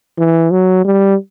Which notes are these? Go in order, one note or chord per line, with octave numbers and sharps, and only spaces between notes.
E3
F#3
G3